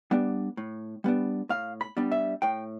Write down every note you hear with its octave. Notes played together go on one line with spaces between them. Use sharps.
G3 B3 D4
A2
G3 B3 D4
A2 F5
B5
G3 B3 D4
E5
A2 G5